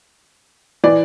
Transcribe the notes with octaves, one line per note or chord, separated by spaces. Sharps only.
E3 D5